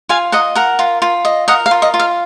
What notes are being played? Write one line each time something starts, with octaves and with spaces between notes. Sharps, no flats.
F4 F5 G#5
D#5 F#5 A#5
A#4 F#5 A#5
F4
F4
D#5
A#4 D#5 F#5
F5
F4
D#5
F4
F5